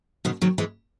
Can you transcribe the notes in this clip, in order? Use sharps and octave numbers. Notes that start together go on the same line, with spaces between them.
B2 D#3
D#3 F#3
E3 G#3